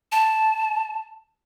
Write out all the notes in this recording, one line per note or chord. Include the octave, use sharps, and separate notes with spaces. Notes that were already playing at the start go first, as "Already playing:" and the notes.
A5